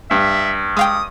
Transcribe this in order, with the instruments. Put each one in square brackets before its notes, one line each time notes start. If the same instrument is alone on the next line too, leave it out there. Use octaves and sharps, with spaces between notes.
[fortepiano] G2 [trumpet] E5
[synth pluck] G#3 F5 G5 [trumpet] D#6